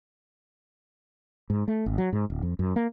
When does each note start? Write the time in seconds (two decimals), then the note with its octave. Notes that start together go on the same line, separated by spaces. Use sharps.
1.50 G#2
1.68 A3
1.86 G#1
1.98 F#3
2.13 G#2
2.30 D1
2.42 F2
2.59 F#2
2.76 A#3